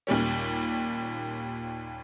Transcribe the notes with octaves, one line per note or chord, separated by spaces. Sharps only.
D#2 A#2 G3 C#4